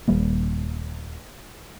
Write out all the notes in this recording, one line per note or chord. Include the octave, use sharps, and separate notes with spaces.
D#1 D#3 G3 A#3